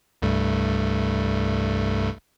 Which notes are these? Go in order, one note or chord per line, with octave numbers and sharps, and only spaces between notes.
C2 G2 A3